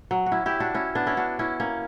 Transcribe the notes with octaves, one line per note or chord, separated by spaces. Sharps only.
F#3
F#4
C#4 E4
E4 G4
D4 F#4
C#4 E4
B3 D4
C#4 E4
D4 F#4
C#4 E4
A#3 C#4